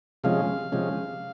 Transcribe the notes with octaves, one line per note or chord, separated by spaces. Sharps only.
C3 F3 G#3 C#4 F5
C3 F3 G#3 C#4